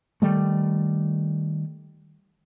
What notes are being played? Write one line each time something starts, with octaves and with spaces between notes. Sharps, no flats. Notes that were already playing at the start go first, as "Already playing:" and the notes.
D#3 G3 A3